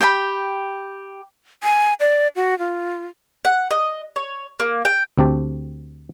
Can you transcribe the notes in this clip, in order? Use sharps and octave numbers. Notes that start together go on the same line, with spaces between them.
G4 G5 G#5 B5
G#5
D5
F#4
F4
F#5
D#5
C#5
A#3
G5
D2 C4 G4 A5